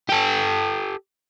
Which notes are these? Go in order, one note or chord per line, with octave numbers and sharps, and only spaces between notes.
G4 A4